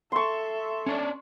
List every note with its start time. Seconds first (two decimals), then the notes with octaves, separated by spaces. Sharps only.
0.12 A4 E5 C6 C#6
0.86 C#4 D4 D5